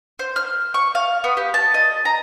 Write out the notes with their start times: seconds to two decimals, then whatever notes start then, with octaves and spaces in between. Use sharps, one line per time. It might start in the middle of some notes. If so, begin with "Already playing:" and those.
0.19 C5
0.36 F6
0.74 C#6
0.95 F5
1.24 B3
1.37 G4
1.54 A5
1.74 D#5
2.05 A#5